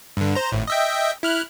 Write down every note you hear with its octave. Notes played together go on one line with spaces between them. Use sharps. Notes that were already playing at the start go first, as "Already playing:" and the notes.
G2 D3
C5 A#5
G#1 A2
D#5 E5 G5
E4 F6 F#6